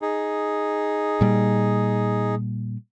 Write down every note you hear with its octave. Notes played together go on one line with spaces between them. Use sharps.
D#4 G#4
A#2 G3